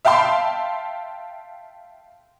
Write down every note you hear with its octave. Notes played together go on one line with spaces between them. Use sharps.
E5 F5 G5 A5 C6